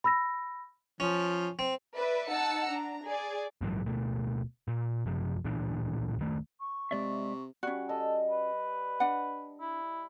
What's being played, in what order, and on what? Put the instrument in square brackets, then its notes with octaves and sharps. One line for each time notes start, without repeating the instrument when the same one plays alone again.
[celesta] B5 E6 A#6
[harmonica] F3 [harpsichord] C#4
[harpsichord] C4
[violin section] B4 D5 E5
D#4 F#5 A5 E6 C#7
D4 A#5
G#4 D5
[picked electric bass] A#1 G#2 E3 F#3
D1 B2 A3
A#2
F#2 C3 F3
D1 A#2 E3 D4
D1 D#3 A3
[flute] C#6
[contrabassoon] C3 [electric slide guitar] G#3 D5 E5
[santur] G3 [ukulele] C#4 F#4
[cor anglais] A4 [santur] D#5
[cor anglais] B4
[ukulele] D4 F#5
[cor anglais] E4